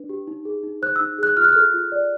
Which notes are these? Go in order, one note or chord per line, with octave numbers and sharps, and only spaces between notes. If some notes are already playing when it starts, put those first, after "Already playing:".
Already playing: D4 B4
G4
D#4
G#4
D#4
C5 F#6
E6
D#4
G#4 F#6
F4 F6
F#6
A4 F6
F4
D5